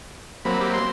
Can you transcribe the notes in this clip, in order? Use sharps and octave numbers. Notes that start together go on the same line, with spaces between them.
F#3 A#3 C4 B5
G4
C6